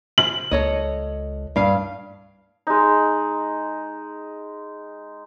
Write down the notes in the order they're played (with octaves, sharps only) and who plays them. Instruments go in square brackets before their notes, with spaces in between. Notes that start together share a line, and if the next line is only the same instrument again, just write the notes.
[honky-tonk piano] F#7
[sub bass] C#2 [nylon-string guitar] A4 C#5 D#5
[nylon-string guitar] G2 F5
[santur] G#3 D#4